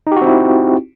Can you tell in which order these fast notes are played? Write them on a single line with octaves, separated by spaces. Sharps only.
D#4 G4 F#4 C4 E4